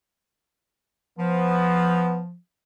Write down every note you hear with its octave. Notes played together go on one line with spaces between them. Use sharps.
F3 B3